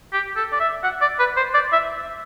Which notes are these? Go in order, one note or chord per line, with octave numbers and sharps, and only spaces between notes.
G4
A4
D5
E5
F#5
D5
B4
C5
D5
E5